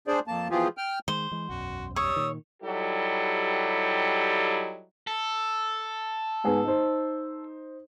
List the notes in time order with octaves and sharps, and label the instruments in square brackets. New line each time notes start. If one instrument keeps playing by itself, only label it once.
[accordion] D4 G#4 C5 D5
F2 A#3 A5
B2 E3 F3 F4 G4 G#4
G5 F6
[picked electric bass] D#3 G#3 [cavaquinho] C5
[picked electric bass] E3 G#3
[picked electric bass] E1 B1 F#2 [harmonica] F#4
[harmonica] G3 D#6 E6 [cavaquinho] C#5
[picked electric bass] A#2 D#3
[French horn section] F#3 G3 D#4 E4 G4 A4
[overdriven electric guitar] A4
[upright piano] G#2 B3 G#4
D#4 C5